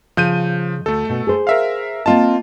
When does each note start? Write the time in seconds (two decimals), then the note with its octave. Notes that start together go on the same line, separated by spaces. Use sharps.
0.17 C#3 F3 G6 D#7
0.86 D2 A3 A4
1.09 B2
1.27 G#4 C5
1.47 A#4 E5 F5
2.06 A#3 C4 F4 D#5 A5